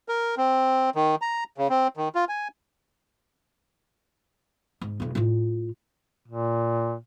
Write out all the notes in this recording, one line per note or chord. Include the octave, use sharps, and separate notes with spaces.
A#4
C4
D#3
A#5
C#3
C4
D#3
F4
G#5
G#2
B1 F2
A2 F4
A#2